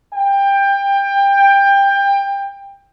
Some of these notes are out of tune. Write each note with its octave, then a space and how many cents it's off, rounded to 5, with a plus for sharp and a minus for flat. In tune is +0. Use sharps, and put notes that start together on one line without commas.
G5 +20